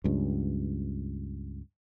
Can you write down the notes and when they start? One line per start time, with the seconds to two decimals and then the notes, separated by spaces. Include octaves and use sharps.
0.04 C#2 G2